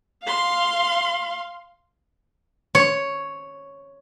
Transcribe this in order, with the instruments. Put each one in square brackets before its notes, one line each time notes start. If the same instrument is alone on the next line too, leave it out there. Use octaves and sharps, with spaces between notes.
[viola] F5 C6
[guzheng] C#5